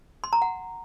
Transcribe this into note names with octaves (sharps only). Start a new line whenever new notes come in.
C6
A#5
F#5